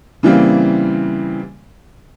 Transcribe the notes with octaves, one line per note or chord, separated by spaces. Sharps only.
C#3 E3 G3 A#3 C4